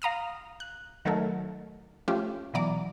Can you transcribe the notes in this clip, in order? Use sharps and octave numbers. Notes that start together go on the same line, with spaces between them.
F5 A#5 D#6 F6
F#6
D#3 F#3 A3 A4 A#4
F3 A3 C#4 F4 G4
B2 E3 F#3 D5 A#5 D6